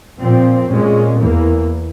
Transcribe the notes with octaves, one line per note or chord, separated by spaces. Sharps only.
A#2 F3 C4
A#2 G#3 C#4
E2 E3 A#3